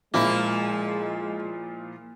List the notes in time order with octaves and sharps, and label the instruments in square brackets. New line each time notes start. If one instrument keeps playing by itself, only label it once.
[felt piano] A#2 [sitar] F3 E4 [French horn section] G#3 [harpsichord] A#3